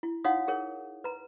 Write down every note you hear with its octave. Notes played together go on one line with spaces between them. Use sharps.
E4
D#4 F#4 C#5 F5 F#5 D#6
G#4 A#4 C#5
B4 A#5